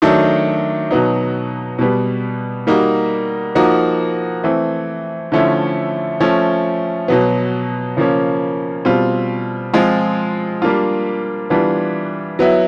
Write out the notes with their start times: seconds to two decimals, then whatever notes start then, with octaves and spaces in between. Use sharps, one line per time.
0.02 D#3 F#3 A3 D4
0.91 B2 F#3 B3 D#4
1.79 B2 G3 B3
2.67 G3 A#3 D#4 F#4
3.55 F3 A#3 D#4 F#4
4.44 E3 A3 C4
5.32 D3 F3 A3 C#4 E4
6.20 F3 A3 C#4
7.08 B2 F#3 B3
7.97 C#3 F3 A#3 C#4
8.85 B2 G3 C4 F4
9.74 F3 G#3 C4 F4
10.62 G3 A#3 D4 F4
11.50 E3 G3 B3 D4 F4
12.39 F#3 B3 E4